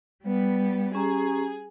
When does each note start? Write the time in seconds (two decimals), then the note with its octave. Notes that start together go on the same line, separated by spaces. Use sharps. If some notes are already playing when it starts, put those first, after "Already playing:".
0.24 G3 B3
0.95 C#4 G4 G#4 A#5